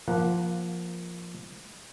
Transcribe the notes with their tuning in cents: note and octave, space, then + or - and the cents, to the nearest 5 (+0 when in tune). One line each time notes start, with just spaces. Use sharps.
F3 +0 A#3 +10 F#5 +0